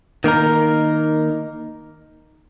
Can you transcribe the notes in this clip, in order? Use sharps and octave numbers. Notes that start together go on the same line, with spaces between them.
D#3 A#3 D#4 A#4